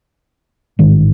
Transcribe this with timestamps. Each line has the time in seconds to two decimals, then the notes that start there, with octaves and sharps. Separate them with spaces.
0.79 A1 G#2 D#3